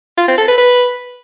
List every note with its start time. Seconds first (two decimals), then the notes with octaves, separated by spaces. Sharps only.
0.18 F4
0.28 C4
0.38 A4
0.48 B4
0.58 B4